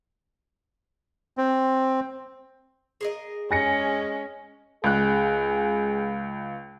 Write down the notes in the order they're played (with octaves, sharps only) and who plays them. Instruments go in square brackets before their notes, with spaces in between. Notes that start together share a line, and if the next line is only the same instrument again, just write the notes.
[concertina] C4
[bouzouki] G#4 A#4 D#5
[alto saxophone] G#3 [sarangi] C#4 [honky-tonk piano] G#5 A#6 C#7
[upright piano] C#2 F#6 [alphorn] G#4